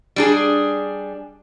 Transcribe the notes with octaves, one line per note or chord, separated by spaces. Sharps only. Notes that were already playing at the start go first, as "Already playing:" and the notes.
G3 D4 G#4